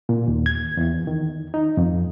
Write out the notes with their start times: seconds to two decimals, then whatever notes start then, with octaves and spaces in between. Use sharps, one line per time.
0.09 A#2
0.28 D#2
0.46 G#6
0.77 E2
1.07 D#3
1.54 D#4
1.77 F2